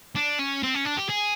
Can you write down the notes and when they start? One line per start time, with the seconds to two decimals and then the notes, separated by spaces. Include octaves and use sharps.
0.16 D4
0.39 C#4
0.63 C4
0.74 C#4
0.85 D4
0.97 G4
1.09 G#4